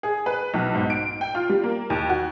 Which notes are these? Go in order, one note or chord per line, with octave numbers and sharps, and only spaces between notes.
G#4
B4
B1
G#2
D7
G5
F4
G3
A#3
D#2
F#4